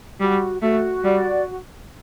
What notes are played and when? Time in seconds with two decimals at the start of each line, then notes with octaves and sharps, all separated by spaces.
0.20 G3 F#4
0.61 A3 F#4
1.04 G3 D5